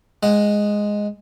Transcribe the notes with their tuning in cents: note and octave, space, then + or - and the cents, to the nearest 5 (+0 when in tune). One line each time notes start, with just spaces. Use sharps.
G#3 +0 F#5 +0